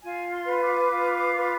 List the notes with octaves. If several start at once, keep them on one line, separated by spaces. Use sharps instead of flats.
F4 G#5
C6
B4
D6
F4
B4